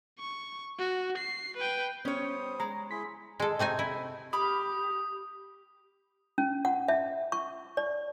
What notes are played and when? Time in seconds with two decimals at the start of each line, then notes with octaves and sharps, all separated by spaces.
0.19 C#6
0.79 F#4
1.18 C7
1.57 B4 G5
2.05 G3 B3 C#4 C5 C#5 D#6
2.60 G#3 A#5
2.91 E4 G#4 C6 B6
3.40 G#3 A4
3.59 C3 A3 D#4 G#5
3.79 E4
4.33 G4 B5 D6 D#6 F6
6.38 C#4
6.65 F#5
6.88 E5
7.32 C#6
7.77 D5